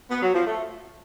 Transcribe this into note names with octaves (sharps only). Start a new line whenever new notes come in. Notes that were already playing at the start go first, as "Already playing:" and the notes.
B3
F#3
F3
A3